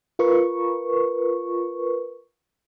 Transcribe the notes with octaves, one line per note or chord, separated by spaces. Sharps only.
F4 A#4 B4 C#6